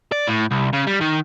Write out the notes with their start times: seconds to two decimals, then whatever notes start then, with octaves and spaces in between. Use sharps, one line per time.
0.12 D5
0.27 A2
0.51 C2
0.73 C#3
0.87 G3
1.01 D#3